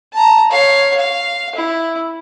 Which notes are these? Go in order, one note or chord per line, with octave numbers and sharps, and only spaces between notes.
A5 A#5
C#5 F5
F5
E4